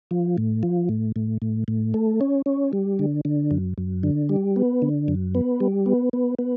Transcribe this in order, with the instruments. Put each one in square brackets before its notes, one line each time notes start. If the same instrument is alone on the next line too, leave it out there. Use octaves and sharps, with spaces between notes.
[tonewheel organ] F3
A2
F3
A2
A2
A2
A2
A3
C#4
C#4
G3
D3
D3
F#2
F#2
D3
G3
B3
D3
F#2
B3
G3
B3
B3
B3